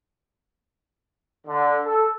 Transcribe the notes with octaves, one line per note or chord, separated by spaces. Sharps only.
D3
A4